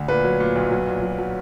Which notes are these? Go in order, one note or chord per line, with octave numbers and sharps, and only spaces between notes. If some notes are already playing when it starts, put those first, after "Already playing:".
Already playing: D2
A#2 B4
F#3
A#2
B1
F#3
A#2
F#3
F#3